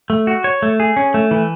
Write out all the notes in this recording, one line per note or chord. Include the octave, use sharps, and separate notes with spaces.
A3
F#4
C#5
A3
G#4
C#4
A3
E3